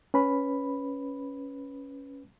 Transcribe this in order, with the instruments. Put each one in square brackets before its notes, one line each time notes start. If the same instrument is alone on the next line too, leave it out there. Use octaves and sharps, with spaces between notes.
[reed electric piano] C#4 B4 B5